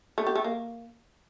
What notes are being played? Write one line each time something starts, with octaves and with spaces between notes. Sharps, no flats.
A3
G4
A3
A#3